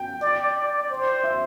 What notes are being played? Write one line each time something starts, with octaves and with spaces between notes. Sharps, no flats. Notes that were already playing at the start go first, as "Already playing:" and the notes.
Already playing: G5
D5
D5
C5
E5